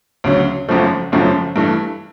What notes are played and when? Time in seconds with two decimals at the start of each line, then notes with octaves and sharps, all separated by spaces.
0.24 D2 C#3 F#3
0.69 G#1 F#2 C#3 F3 A3
1.12 G#1 F#2 C#3 F3 A3
1.56 G2 E3 A3